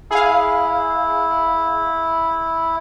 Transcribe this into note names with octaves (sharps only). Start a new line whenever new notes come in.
E4 G#4 F5